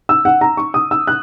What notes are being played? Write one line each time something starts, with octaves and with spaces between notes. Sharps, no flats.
E6
F#5
A#5
C#6
D#6
E6
F#6